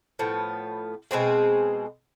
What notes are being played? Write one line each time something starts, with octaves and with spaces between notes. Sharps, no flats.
A2 F3 B3
B2 G#3 C4 G#4